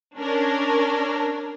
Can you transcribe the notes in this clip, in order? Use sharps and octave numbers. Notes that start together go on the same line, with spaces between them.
C#4 D4 A#4